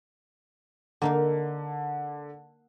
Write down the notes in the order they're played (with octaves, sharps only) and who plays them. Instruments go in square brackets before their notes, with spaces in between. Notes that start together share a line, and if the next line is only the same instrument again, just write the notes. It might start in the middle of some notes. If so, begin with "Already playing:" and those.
[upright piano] D3 [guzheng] A#3 D#4 A#4